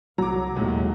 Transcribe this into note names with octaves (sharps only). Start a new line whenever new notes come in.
C2 F#3 A#5 D6
D#1 D#2 A2 G#3